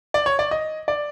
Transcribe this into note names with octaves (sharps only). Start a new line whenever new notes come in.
D5
C#5
D5
D#5
D5